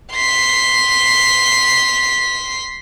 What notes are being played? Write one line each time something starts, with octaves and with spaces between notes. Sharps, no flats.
C6 B6